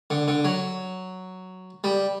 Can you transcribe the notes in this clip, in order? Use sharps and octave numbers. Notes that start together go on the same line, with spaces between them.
D3
D3
F#3
G3